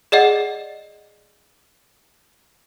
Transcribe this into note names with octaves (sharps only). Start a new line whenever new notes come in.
G#4 D5 D#5 F#5